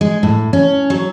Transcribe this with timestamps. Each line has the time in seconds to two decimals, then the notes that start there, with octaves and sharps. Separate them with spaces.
0.01 G#3
0.23 A2
0.53 C#4
0.90 F#3